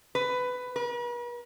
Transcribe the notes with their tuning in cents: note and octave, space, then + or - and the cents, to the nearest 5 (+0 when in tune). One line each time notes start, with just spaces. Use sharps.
B4 +15
B4 -45